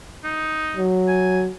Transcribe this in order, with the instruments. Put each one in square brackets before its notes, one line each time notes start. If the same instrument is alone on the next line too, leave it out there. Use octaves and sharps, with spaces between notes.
[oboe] D#4
[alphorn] F#3
[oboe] G#5